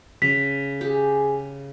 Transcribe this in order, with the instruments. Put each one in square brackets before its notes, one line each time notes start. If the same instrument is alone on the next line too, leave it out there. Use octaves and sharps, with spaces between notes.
[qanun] C#3 [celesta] B6
[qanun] G4 [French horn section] G#4